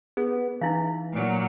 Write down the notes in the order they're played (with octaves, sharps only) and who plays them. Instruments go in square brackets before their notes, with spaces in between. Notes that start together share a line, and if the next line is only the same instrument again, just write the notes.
[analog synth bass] B3 [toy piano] G#4
[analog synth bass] E3 [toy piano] D#4 E4 F5
[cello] A#2 F#3